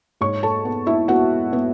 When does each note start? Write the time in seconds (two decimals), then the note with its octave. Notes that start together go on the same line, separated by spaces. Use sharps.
0.21 G#2 C#5 C#6
0.43 A4 A5
0.65 B3
0.87 E4 E5
1.08 B3 F#4 F#5
1.53 B3